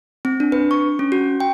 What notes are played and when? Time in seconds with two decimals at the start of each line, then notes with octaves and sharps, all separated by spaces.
0.25 C4
0.40 D4
0.52 B4
0.71 C#6
0.99 C#4
1.12 F#4
1.40 G5